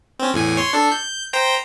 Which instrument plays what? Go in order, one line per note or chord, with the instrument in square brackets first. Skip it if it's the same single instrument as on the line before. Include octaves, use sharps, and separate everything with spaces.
[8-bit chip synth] C4 C#4
E2 A2 G#5
C#5 C6
D4 A4
G6
C5 G5 A#5